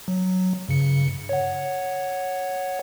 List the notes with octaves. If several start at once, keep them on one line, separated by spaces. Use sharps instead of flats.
F#3
G2 C#3 C#7
C#5 F#5